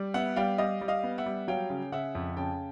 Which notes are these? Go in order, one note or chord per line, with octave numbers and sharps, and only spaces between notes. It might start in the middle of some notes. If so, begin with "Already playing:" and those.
Already playing: G3
B3 E5 F#5
G3 F5 G5
G3 D#5 F5
G3
D#5 F5
B3
E5 F#5
G3
F#3 F5 G5
C#3
C#3 E5 F#5
F2
C#3 G5 A5